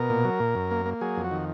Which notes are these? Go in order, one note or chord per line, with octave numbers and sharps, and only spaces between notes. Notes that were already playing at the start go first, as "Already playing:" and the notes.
Already playing: B2 A#4
A#2
F#3
A#2
F#2
A#3
A#3
F#3 G#4
F2
F#4
D#3